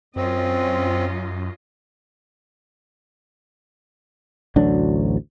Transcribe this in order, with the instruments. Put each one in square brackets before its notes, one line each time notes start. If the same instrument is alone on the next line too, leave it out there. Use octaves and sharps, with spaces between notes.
[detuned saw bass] F#2 [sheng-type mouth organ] C4 [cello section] C#4 F4 D#5
[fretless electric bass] A1 D2 F#3 D4